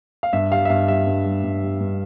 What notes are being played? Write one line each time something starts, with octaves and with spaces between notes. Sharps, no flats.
F5
G2 E5
G3 F5
E5
G2 F5
G3 E5
G2
G3
G2
G3
G2